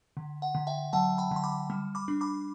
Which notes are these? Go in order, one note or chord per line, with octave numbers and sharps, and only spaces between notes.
D3
F#5
D3
E5 G5
F#3 F#5 A5
G5 B5
D3 C6
B5 D6
G3
B5 D6
D4
B5 D6